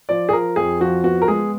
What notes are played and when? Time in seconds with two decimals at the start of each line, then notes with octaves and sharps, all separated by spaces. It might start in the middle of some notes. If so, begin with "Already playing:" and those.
0.09 F3 D5
0.29 G#4
0.33 F3 A#4
0.56 F2 G#4
0.80 F3 F#4
1.04 B3 F#4
1.22 A#4
1.28 G#3 G#4